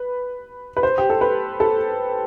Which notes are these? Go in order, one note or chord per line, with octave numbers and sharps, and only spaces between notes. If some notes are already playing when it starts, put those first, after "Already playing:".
Already playing: B4
B4
C5
G4
A4
B4
A4